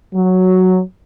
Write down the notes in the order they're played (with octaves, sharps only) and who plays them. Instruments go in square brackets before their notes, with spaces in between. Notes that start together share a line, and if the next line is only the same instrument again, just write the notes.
[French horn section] F#3